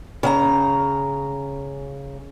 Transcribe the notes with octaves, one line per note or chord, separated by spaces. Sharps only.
C#3 F#5 A#5